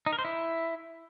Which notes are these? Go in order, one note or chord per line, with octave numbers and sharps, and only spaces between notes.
D#4
A#4
C5
E4